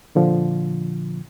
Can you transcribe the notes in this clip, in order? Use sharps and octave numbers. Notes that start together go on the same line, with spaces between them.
A#2 D3 F3